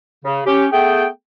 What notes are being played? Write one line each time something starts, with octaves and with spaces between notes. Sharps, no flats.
C#3
C#4 G4
A3 B3 G#4 G5